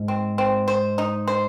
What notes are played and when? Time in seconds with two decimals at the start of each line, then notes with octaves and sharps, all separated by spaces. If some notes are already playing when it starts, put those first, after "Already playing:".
Already playing: G#2
0.08 C4
0.38 C4
0.68 C5
0.98 D#4
1.28 C5